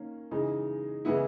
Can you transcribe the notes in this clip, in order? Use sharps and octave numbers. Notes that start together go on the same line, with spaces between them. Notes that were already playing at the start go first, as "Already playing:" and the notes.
Already playing: D#3 A#3 C#4
C#3 E3 G#3 D#4
C#3 E3 G#3 B3 E4